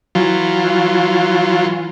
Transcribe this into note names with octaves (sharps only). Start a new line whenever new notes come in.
E3 F#3 F4